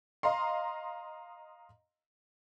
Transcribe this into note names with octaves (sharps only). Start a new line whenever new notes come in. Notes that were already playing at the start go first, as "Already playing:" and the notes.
D#5 F5 A#5 C6